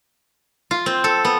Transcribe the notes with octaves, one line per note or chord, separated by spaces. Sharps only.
F4
C4
A4
B3